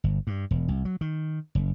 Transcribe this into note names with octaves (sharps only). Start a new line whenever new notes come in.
G1
G2
E1
C2
F#3
D#3
F#1